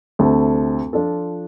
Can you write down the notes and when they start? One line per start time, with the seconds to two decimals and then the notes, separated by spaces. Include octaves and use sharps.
0.19 D2 C3 A3 C4
0.93 F3 D4 F4 A4